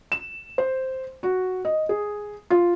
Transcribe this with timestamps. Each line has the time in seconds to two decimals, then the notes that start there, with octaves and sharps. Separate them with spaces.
0.12 E7
0.58 C5
1.23 F#4
1.65 D#5
1.89 G#4
2.50 F4